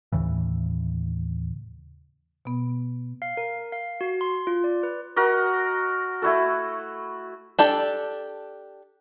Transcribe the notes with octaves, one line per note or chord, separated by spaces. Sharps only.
D#2 A2 C#3 E3
B2 B3
F5
A#4
F5
F#4
C6
F4
D5
B4
F#4 A#4 D#5
A3 E4 F#4 A4
D4 G4 A4